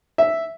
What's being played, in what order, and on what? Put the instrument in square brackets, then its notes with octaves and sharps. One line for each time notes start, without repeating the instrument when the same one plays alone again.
[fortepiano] E5